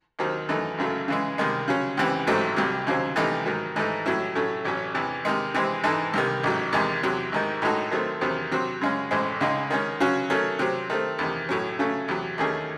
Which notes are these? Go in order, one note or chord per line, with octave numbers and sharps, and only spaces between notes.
D#2 D#3 F#3 C4
F#2 E3 A3 D#4
G#1 F#2 C#3 F#3 A3
C#3 E3 G#3
C2 C3 D#3 G#3
C#3 F#3 C#4
C#2 C3 E3 C4
A1 G#2 F#3 A3 C4
C2 C3 F#3
D#2 C#3 F#3 C4
C2 C3 E3 A3 D#4
G#2 D#3 F#3
G#2 E3 A3 D#4
A2 F#3 C#4 E4
A2 F#3 A3 C#4
A1 A2 F#3 C#4
E2 C3 E3
C3 D#3 G#3
C3 E3 G#3 C4
G#2 E3 G#3 D#4 A4
C2 C3 D#3
A1 G#2 F#3
E2 C3 D#3 G#3
E2 C3 F#3
G#1 G#2 D#3
A2 G#3 D#4 F#4 A4
D#3 F#3 A3 C4
E2 C3 D#3 F#3 C4
C3 F#3 C4 F#4 C5
F#2 C#3 G#3 C#4
A1 A2 G#3 C4
C#2 C#3 G#3 D#4
D#3 G#3 C#4
C#3 F#3 C#4 F#4
D#3 F#3 A3 C#4
C3 F#3 C4
D#3 A3 C4
E2 C3 D#3
A2 F#3 C#4
C#3 F#3 A3 C#4
E2 C3 F#3
D#2 D#3 A3 C#4 G#4